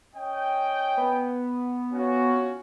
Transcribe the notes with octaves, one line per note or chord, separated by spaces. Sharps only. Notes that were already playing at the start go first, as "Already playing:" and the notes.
C#4 D#5 G5
B3
C#4 F4 F#4